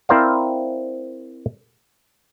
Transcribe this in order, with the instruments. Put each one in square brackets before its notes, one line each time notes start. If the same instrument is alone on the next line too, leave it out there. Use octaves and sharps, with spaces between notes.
[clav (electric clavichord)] C4 E4 A#4 C5 D5 F5